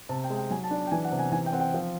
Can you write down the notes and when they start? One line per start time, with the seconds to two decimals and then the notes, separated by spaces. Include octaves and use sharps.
0.09 C3 A5
0.24 G5
0.30 G#3
0.37 G5
0.50 F#3 G#5
0.64 A5
0.71 D4
0.78 A5
0.87 G5
0.91 E3 G#5
1.04 F#5
1.12 C3
1.19 G#5
1.32 E3 G#5
1.46 G5
1.52 C4 F#5
1.60 G5
1.74 F3